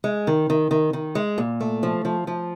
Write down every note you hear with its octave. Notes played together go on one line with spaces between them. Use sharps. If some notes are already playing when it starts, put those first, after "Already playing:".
G#3
D#3
D#3
D#3
D#3
G#3
A#2
A3
F3
F3
F3